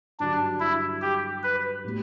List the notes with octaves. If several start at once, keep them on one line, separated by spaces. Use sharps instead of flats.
G2 D3 F#3 D4
E4
G4
B4
A2 G3 B3 F#4